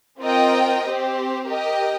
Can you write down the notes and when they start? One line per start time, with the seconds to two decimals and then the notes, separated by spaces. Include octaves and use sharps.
0.22 C4 F4 A#4 D#5 G5
0.85 C4 G4 C5
1.48 G4 A#4 D#5 G5